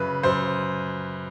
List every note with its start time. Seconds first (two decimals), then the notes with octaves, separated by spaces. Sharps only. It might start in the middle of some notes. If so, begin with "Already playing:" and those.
Already playing: F#2 C#3 B4
0.23 F#2 C5